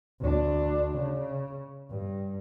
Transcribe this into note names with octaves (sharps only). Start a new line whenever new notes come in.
D2 D4
C#3
G2